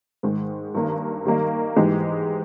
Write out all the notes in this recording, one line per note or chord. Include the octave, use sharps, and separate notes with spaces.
G#2 D#3 G#3
G2 D#3 A#3
D#3 G3 A#3 D#4
G#2 E3 G#3 D#4 G4